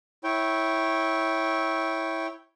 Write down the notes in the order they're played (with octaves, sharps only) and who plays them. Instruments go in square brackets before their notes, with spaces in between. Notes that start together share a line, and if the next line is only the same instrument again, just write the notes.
[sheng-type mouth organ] E4 C#5 G5